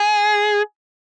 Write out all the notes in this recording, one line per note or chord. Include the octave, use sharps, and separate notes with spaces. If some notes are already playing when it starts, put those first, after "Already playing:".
Already playing: G#4